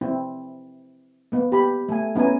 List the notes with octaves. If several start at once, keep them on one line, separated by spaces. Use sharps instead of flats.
C4 E4
A#3 B3
G4 B5
A3 G#5
B3 C#4 E4 G#5 A#5